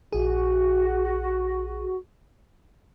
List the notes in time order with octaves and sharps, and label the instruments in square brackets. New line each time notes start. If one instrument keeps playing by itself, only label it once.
[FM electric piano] A#1 G#4 [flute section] F#4